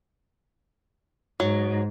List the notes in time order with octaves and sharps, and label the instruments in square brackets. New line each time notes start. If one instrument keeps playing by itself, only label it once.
[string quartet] G#2 [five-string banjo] F#3